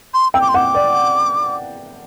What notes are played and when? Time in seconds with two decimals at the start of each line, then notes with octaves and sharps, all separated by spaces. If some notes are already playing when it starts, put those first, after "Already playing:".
0.14 C6
0.34 G5 E6
0.41 D6
0.49 C6
0.54 F#5 D6
0.75 D5